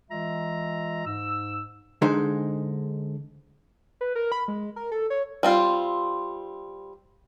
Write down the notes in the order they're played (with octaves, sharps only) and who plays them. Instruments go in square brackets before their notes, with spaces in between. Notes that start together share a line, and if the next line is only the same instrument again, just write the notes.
[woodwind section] E3 G#3 F4 E5 A#5
G#2 E6
[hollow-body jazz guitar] D3 G#3 D#4 G#4 C5
[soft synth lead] B4
A#4
B5
G#3
A#4
A4
C#5
[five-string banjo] G3 C4 F4